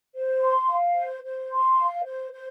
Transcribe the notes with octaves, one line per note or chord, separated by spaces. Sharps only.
C5
C6
F5
C5
C5
C6
F5
C5
C5